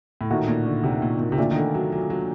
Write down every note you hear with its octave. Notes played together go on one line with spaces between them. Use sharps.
A2
A#2 D#3 A3 D#4 F#4
A#2
D3
C3
A#2
A#2
C3
A#2 D3 A3 D4 A4
D#3
D3
F#3
F#3
F#3